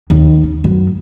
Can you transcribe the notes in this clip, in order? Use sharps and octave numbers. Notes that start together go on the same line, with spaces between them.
D#2
C#3
F#2